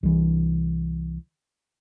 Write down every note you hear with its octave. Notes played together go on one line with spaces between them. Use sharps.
C2 E3